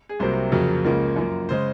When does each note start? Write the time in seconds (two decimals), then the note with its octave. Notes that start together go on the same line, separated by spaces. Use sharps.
0.09 G#4
0.20 C2 C3 F#3 A#3 C5
0.52 F2 C#3 F#3 A#3
0.84 C#2 C#3 F3 A#3
1.16 F#2 F3 A#3
1.49 C#3 G#3 C5